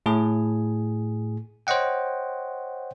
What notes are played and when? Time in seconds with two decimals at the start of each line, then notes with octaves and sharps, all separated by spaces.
0.06 A2 G#4
1.67 C5 C#5 D#5 F#5 G5